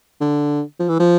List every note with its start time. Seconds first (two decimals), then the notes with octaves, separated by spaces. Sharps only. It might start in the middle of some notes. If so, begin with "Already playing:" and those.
0.21 D3
0.80 F3
0.89 E3
1.00 F3